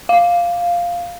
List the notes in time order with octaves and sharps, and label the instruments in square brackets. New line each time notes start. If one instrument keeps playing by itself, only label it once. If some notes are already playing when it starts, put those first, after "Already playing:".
[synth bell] F5